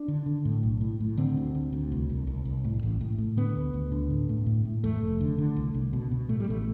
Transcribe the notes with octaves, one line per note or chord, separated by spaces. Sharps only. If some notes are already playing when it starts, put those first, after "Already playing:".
Already playing: D4
D3
D3
A2
B1
A2
A2
D3 C4
D2
D2
D2
C2
C2
C2
C2
A2
A1
A2
A2
D3 B3
D2
D2
D3
A2
A2
A2
A2
E2 A3
F1
D3
D3
C2
C2
B2
B2
A2 A3
G3
A1 A3